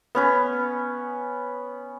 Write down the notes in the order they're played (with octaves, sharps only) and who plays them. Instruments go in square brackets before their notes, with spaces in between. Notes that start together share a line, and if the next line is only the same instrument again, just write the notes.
[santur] B3 C#4 B4